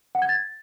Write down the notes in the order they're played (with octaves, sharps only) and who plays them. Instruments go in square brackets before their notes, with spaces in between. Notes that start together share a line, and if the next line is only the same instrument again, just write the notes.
[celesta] F#5
G#6
A6